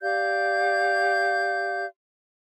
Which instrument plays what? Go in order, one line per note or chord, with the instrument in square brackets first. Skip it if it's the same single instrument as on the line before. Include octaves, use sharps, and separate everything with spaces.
[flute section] G4 D5 F5 G6